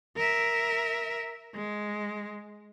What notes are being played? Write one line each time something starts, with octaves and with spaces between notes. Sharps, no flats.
A#4 E5
G#3